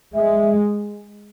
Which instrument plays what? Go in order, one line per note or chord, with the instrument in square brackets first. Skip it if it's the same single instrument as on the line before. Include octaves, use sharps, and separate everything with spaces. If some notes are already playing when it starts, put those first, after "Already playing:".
[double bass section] G#3 [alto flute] E5